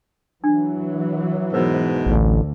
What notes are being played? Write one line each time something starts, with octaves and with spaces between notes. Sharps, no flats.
E3 F#3 D4
G#2 B2 A#4 C5
A1 D2